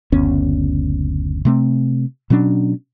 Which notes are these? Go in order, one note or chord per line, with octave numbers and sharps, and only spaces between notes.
F#1 D2 B3 C#4
C3 A3 C4
B2 F#3 C#4 D4